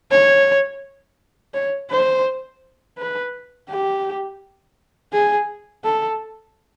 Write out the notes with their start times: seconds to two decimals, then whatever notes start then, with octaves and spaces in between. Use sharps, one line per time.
0.11 C#5
1.54 C#5
1.90 C5
2.97 B4
3.69 G4
5.13 G#4
5.84 A4